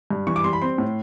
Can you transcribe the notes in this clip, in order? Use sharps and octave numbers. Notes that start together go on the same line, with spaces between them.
G2
E3 C#6
D6
G3 C6
B5
C4 C6
A2